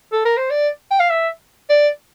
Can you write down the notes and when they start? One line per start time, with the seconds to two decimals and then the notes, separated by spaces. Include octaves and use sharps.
0.12 A4
0.25 A#4
0.37 C5
0.50 D5
0.91 G5
1.00 F5
1.10 E5
1.70 D5